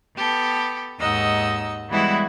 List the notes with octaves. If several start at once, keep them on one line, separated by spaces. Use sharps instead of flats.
B3 G4 A4
D#2 G#2 D#4 D#5 F#5 E6
E3 G3 G#3 B3 E4 F#4